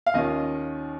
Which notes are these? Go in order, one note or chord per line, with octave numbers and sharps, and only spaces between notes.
F5
D#2 D#3 C#4 F4 D#5